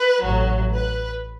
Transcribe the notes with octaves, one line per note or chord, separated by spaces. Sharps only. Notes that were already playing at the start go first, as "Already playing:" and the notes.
Already playing: B4
A1 A2 F#3
B4